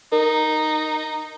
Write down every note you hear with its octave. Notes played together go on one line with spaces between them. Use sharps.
D#4 A#4